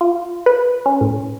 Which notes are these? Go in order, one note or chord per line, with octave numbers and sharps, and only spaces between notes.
F4
B4
C#4
A2